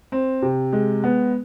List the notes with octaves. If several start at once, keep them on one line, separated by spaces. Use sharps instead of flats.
C4
C3
G#3
B3